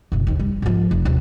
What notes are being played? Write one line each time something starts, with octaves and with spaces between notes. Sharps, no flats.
F#1 B1
D#2 D#3
G3
G#2 F3
F1
D#2 C3